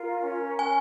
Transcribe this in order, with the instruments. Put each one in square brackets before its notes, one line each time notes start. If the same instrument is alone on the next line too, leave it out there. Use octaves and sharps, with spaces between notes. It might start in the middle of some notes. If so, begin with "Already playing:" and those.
Already playing: [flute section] F4 A#4
C#4
[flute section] C#4 [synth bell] G#5